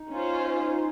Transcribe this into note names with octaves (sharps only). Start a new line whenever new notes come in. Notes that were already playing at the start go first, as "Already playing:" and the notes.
Already playing: D#4
C#4 F4 C5